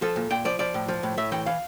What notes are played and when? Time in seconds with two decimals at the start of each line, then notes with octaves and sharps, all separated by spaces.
0.02 F3 A4
0.16 A#2
0.30 A#2 G5
0.45 F3 D5
0.59 F3 D5
0.74 A2
0.88 F3
1.03 A2
1.17 A2 E5
1.32 E3 G5
1.46 E3 F5